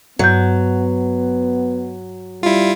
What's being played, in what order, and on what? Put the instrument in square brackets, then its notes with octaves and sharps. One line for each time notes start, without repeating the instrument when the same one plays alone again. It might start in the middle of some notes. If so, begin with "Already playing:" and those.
[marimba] G2 G6 [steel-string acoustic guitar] F#3 [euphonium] B3
[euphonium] G3 [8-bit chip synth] E4 F4